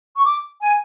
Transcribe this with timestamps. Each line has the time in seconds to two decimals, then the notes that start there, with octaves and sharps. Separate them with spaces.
0.16 C#6
0.25 D6
0.61 G#5